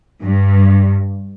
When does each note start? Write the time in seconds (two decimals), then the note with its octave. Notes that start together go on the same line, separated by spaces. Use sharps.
0.22 G2